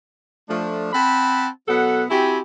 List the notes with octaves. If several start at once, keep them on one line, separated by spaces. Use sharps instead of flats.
F3 A3 D4
C4 F#5 A5 B5
B2 F#3 B3 A4 F#5
C4 E4 F#4 G4 G#5 B5